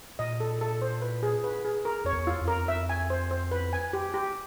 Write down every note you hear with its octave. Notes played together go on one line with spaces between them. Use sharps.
A#2 D#5
A4
A4
C5
B4
G#4
B4
G#4
A#4
F2 C#5
E2
F4
F2
A#4
E5
G#5
C5
C5
B4
G#5
G4
G4